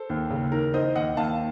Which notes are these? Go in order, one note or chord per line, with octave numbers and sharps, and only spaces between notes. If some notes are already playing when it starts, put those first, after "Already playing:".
Already playing: A4 C5
D#2
C#3
D#3 A#4
D#3 C5 D#5
D#2 D#5 F#5
D#2 F5 A5